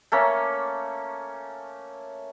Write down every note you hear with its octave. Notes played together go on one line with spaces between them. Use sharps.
A3 A#3 C#4